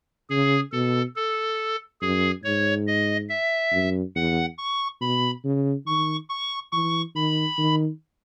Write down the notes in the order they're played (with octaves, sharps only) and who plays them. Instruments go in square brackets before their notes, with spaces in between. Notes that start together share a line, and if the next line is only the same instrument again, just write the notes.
[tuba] C#3 [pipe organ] G#4
[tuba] B2 [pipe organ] A4
[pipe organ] A4
[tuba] F#2 [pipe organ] G#4
[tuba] G#2 [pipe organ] C#5
[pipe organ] D#5
E5
[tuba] F#2
[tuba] E2 [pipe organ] F#5
[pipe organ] C#6
[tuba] B2 [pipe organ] B5
[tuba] C#3
[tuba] D#3 [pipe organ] C#6
[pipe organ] C#6
[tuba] E3 [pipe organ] C#6
[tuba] D#3 [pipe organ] B5
[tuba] D#3